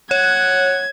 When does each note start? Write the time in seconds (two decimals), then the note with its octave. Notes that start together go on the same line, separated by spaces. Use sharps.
0.11 C#5 F#5 G#6